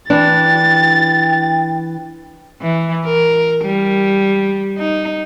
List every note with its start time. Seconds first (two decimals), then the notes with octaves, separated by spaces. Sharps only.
0.10 E3 D4 G5 A6
2.61 E3
3.05 A#4
3.65 G3
4.78 D#4